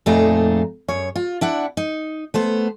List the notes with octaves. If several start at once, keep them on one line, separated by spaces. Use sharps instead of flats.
F2 A#2 A3 D#4 G#4 A#5
F#2 C#5
F4
D4 E4 F#5
D#4
A3 B3 C5